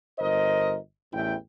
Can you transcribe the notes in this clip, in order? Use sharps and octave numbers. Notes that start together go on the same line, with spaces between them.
G1 A#4 C5 D#5
A1 E2 E4 G5